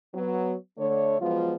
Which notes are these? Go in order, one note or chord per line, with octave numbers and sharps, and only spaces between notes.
F#3 B3
D3 A3 C#5
F3 F#3 G#3 B3 F4